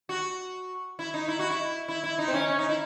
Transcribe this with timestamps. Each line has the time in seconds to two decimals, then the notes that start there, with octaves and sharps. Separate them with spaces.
0.09 F#4
0.99 E4
1.14 D#4
1.28 E4
1.39 F#4
1.50 E4
1.88 E4
2.04 E4
2.18 D#4
2.28 C4
2.34 C#4
2.49 C#4
2.58 D#4
2.69 E4